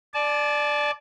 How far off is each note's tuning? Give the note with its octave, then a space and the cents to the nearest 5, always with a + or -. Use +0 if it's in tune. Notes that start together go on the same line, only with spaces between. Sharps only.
D5 +5 A5 -35